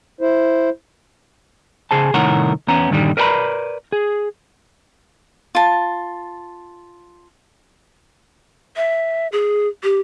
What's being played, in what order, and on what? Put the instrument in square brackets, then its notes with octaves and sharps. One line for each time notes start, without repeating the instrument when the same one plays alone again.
[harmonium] E4 C5
[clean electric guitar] C#3 G#4 C5 A5
C2 A2 D#3 A#4 C#5 F#5
E2 B3 C#4 A#5
G2 A#2 D3 D#3 G3
A#4 B4 D5 F#5 A#5 B5
G#4
[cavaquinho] F4 A5
[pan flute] E5
G#4
G4